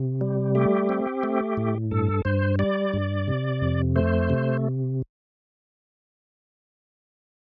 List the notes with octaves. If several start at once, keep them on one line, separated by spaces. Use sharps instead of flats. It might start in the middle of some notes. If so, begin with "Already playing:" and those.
Already playing: C3
G3
A3 G4
C4
A3
A2
G2 A4
G2 C5
G3 D5
G2
C3
F2
A3 C5
C3